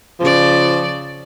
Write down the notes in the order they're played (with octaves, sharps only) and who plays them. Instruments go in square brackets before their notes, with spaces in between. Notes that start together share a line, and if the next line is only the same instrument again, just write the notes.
[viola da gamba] C#3 D5 [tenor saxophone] F3